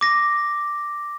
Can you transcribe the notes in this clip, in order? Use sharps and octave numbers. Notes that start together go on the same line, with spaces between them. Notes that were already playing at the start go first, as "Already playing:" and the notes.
D6 A#6